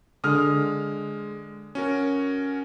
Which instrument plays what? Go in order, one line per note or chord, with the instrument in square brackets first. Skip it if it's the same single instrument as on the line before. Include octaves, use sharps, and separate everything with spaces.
[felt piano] D3 F6 [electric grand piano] G#3 D#6
[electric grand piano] C#4 F#4 A#4